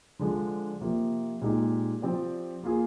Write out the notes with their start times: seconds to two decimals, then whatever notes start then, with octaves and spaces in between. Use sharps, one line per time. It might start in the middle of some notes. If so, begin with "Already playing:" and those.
0.19 D3 F3 G#3 D4
0.81 C3 F3 A#3
1.41 A#2 G#3 D#4 G4
2.02 F3 C4 G4 D5
2.63 A#3 F4 G#4